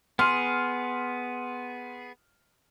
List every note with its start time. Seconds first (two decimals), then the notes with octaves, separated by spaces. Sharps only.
0.19 B3 G#4 C6 F6